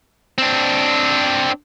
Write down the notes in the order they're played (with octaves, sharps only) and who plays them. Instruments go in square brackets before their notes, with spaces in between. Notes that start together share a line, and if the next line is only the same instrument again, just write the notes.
[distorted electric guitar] C4 D4